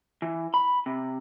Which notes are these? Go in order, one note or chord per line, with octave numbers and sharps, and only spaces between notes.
E3
B5
C3